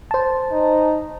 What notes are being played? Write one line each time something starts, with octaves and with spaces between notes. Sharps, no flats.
C5 A5
D#4